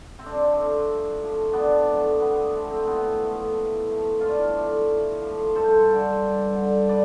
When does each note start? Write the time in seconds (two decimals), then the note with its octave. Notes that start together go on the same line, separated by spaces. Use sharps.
0.19 C3 C4
0.26 D4
0.33 C4
0.53 F3 A3
0.86 C3
1.20 F3 A3
1.53 C3 B3 D4
1.87 F3 A3
2.20 C3 B3
2.37 C4
2.53 F3 A3
2.70 C4
2.87 A2 B3
3.21 F3 A3
3.54 A2
3.87 F3 A3
4.21 A2 D4 F4
4.55 F3 A3
4.88 A2
5.22 F3 A3
5.55 G2 A4 C5
5.88 D3 G3
6.23 G2
6.55 D3 G3
6.89 B4 D5